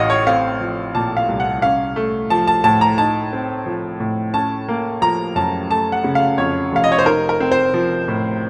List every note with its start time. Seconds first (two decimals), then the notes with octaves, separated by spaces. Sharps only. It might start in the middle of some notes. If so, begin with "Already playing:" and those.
Already playing: A1 A2 D#5 F5 F#5
0.10 C#5
0.27 C4 F5
0.60 F3
0.94 A#2 A5
1.17 F5
1.29 C2
1.40 F#5
1.62 C#4 F5
1.96 A3
2.30 F3 A5
2.48 A5
2.64 A2 A5
2.81 A#5
2.98 D#4 A5
3.33 C4
3.66 F3
4.00 A2
4.34 C#4 A5
4.68 A#3
5.02 F3 A#5
5.35 F#2 A5
5.70 A3 A5
5.92 F#5
6.04 C#3
6.15 F5
6.38 F2 C#5
6.72 F1 F5
6.84 D#5
6.92 C#5
6.99 C5
7.05 D#4 A#4
7.29 A#4
7.40 C4
7.52 C5
7.74 F3
8.08 A2